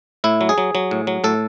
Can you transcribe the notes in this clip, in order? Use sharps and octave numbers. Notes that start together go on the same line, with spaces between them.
A2 E4
F#3
G#4
F#3
F#3
A2
F#3
A2 A4